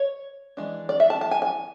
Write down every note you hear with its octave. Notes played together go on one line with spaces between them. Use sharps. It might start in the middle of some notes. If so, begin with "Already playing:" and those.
Already playing: C#5
E3 G#3 D4
D5
E5
A5
A5
G#5
G#5